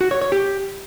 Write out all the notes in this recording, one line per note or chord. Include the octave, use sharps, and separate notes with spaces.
F#4
C#5
C#5
G4